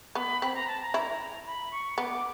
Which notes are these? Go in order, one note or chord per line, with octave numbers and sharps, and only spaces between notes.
B3 B5
C4 B5
A#5
A5
A#5
E4
B5
C#6
B3 D6